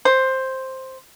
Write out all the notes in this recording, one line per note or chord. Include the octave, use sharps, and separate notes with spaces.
C5